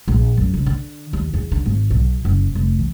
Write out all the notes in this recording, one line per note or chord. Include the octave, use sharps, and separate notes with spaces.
A#1
F#2
C#3
D3
D#2
E2
D3
G#1
B1
F#1
F1
E3